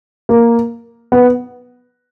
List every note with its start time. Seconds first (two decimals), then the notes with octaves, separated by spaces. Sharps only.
0.29 A#3
1.12 B3